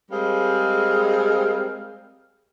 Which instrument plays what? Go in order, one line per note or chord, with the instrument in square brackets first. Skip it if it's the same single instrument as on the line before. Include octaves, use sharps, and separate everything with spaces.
[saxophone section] G3 G#3 C4 G#4 A#4 F5